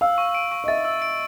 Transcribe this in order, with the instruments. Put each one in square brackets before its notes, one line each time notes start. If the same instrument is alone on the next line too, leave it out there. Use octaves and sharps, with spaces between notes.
[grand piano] F5 [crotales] E6
[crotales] C#6
D7
C#6
[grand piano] D#5
[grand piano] E5 [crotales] A6
[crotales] E6
D7